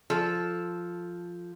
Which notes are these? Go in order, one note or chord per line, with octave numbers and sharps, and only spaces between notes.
F3 A4